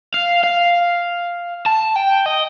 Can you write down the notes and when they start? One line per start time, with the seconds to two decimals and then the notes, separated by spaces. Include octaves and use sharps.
0.14 F5
0.44 F5
1.66 A5
1.96 G5
2.26 D#5